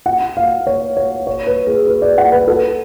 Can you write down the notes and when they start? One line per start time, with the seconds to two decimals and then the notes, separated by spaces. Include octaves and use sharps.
0.06 F#5
0.37 F5
0.67 C#5
0.97 C#5
1.27 C#5
1.47 B4
1.67 G#4
1.87 B4
2.02 D5
2.18 F#5
2.32 B4
2.48 A4